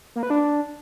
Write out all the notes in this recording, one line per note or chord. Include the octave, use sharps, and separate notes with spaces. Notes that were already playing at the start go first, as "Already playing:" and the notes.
A#3
B4
D4